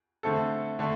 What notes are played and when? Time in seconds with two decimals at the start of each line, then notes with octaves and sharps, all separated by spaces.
0.23 D3 A3 C4 A4
0.79 D3 A3